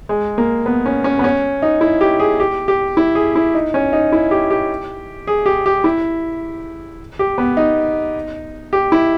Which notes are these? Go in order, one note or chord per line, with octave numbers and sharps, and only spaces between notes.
G#3
A#3
B3
C#4
C#4
B3
C#4
D#4
E4
G4
G#4
G4
G4
E4
G#4
E4
D#4
C#4
D#4
E4
G4
G4
G#4
G4
G4
E4
G4
B3
D#4
G4
E4